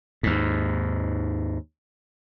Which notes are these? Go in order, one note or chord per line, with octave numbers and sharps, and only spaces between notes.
D#2 G#2